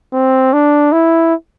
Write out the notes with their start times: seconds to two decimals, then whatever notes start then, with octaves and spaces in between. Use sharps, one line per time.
0.13 C4
0.53 D4
0.92 E4